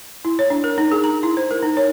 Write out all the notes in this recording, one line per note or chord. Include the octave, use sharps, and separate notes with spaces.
E4
C#5
D4
A#4
D#4
G#4
A#5
E4
C5
A#4
D#4
C#5